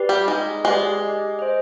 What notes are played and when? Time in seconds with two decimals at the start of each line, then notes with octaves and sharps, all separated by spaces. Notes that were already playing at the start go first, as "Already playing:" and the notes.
Already playing: G4 B4 D5
0.09 G3
0.28 G#3 D#4
0.65 G#3 G4 B4 D5
1.02 G4
1.39 C5 D#5